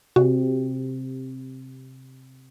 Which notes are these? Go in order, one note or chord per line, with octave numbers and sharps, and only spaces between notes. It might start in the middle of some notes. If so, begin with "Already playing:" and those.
C3 F#4